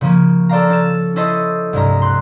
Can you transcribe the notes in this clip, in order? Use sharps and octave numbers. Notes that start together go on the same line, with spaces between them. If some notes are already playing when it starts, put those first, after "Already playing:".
C#3 F3 A#3 C#4
A4 C5 D5 F5 A#5
C#4 A6 E7
C#4 E4 A4 C5 D#5
C2 G2 G#3 A#5
C6 F#6